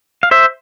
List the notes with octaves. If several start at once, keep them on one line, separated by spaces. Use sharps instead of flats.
F5
C5 E5